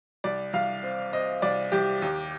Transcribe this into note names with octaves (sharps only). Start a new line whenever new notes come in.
C2 D5
C2 F5
C4
C4 D#5
C2 D5
C2 G4
D#2